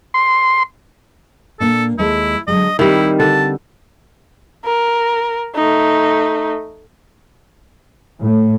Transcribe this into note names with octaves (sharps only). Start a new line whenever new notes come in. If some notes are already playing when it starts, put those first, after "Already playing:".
C6
A#2 A#3 D4 A4
D#2 G#3 E4 A4
D3 F#3 G#3 D#5
D#3 G3 C4 E4 G4 E5
D3 A5
A#4
A3 D#4
A2